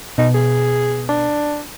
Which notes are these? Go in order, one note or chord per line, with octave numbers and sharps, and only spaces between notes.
B2 D#4
G#4
D4